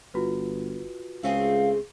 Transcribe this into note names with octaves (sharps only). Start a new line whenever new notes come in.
G1 F4 F#4 B4
C#2 A3 C4 G#4 F5